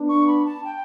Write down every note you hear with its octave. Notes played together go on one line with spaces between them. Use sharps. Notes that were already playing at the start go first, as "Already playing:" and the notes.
Already playing: B3 D4
C#6
B5
A5
G5